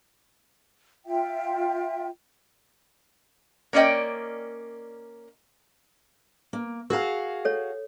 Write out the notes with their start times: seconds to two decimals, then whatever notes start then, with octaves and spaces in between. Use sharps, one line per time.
1.06 F4 E5 G5
3.73 A#3 C#4 D5 D#5 G5
6.53 A#3
6.90 F#4 G#4 A#4 F5 A#5
7.45 A4 C#5